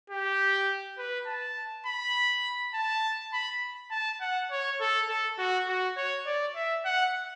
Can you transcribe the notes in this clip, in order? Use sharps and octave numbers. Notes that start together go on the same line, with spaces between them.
G4
B4
A5
B5
A5
B5
A5
F#5
C#5
A4
A4
F#4
F#4
C#5
D5
E5
F#5